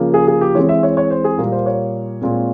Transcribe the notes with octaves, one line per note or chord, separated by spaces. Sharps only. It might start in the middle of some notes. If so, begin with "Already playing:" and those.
Already playing: C#3 F3 A#3
G#4
G#4
G4
E3 G#3 C4 C#5
E5
C#5
C#5
C5
G#4
A#2 G3 A#3 A#4
C5
C#5
A#2 G#3 C4